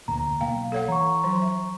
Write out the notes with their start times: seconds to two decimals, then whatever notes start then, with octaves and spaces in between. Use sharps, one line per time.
0.08 F1 D2 A#2 A#5
0.41 B1 A#3 F5 G5
0.72 A4 C#5 F#5
0.88 E3 A#5 C#6
1.24 F3 F#3
1.42 E5